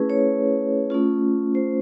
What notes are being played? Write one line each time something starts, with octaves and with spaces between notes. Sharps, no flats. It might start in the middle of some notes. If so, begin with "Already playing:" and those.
Already playing: A3 C#4 E4 G#4 B4
C#5
A3 C#4 F4
C5